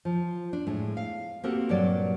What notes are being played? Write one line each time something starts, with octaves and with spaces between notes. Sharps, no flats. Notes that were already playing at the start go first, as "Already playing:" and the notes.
F3
D4
A2 G#3
F5
A#3 C4 F#4 G4 A4 A#4
G2 A#2 F#3 D5